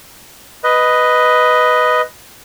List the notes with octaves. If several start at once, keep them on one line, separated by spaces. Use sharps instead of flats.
B4 D#5